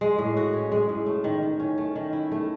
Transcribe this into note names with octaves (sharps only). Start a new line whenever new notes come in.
G#3
A2
F#4
C#4
G#3
A2
A3
D#3
D#3
C#4
A3
D#3
E4
A3